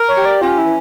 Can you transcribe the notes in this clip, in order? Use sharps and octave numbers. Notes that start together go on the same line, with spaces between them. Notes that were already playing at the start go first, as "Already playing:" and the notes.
Already playing: A#4
C#5
G4
D5
C#4 F4
E4
E3